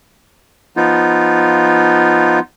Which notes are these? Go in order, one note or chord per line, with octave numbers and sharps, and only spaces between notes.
F3 B3 D#4 F4